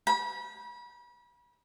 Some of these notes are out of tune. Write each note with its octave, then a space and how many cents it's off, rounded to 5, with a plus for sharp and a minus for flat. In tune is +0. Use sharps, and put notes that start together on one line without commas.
B5 -35